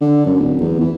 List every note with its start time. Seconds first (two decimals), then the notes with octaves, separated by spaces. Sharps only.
0.01 D3
0.26 F#2
0.40 D1
0.61 E2
0.80 E3